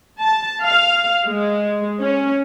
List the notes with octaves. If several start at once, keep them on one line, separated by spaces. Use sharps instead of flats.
A5
F5
G#3
C#4